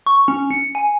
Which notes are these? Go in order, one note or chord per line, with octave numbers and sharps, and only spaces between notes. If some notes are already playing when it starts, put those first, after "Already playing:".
C#6
C#4
C#7
G#5